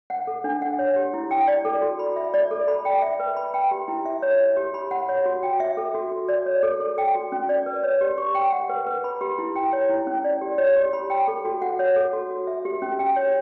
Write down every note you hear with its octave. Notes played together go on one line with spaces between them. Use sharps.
F#5
A4
D4
F#5
C#5
G4
E4
G5
D5
A4
F#4
B5
E5
D5
A4
B5
G5
E5
B4
B5
G5
G4
E4
E5
C#5
C#5
G4
B5
F#5
C#5
F#4
G5
E5
A4
F#4
F#4
D5
C#5
A4
A4
G5
F#4
C#4
D5
B4
C#5
G4
C#6
G5
F#5
B4
B4
B5
G4
E4
G5
C#5
E4
C#4
D5
G4
C#5
G4
B5
G5
A4
F#4
F#5
C#5
A4
F#4
F#4
E5
G4
C#4
G5
C#5